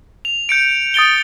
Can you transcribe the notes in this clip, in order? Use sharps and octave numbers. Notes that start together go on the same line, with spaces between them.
F7
G6 C#7 D7
D#6 A6 D7 G7